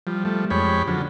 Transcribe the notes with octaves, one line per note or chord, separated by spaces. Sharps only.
F3 G3
F3 G3 A3
F2 G#3 G4 C#5 B5
D3 F3 F#3